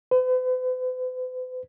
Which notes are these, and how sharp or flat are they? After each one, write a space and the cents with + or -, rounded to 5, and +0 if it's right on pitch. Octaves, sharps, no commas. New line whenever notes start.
B4 +45